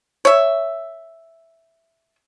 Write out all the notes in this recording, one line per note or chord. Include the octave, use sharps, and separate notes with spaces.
C#5 E5